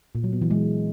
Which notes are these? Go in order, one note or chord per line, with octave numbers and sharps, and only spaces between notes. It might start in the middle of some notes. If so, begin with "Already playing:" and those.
A#2
F#3
B3
E3
G#3